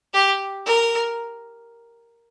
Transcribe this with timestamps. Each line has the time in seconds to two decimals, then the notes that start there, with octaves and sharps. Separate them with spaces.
0.13 G4
0.66 A#4